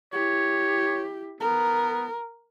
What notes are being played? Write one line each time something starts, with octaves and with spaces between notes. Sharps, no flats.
E4 G4 C#5
B3 A#4